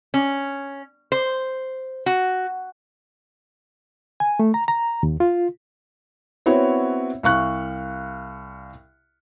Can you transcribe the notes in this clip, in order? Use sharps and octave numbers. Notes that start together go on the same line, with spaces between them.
C#4
C5
F#4
G#5
A3
A#5
A#5
D#2
F4
B3 C4 E4 F#4 C#5
C2 F5 C#6 F#6